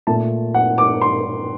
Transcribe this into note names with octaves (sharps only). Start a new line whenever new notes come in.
A#2 A3 A5
F#5
D6
C6